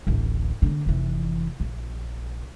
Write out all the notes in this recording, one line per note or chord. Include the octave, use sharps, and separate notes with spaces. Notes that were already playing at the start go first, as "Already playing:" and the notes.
D1 A1
D3 A#3
F1 E3
A#1